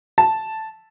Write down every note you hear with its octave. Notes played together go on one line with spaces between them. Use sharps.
A5